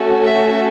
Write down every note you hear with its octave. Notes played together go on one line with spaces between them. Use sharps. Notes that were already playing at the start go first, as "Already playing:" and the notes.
Already playing: A3 C#4 F#4 A4
E5